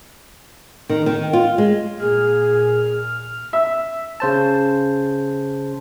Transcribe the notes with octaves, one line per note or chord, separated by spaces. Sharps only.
D#3
D#3
F4
G#3
A#2 G#4 F6
E5
C#3 C5 A5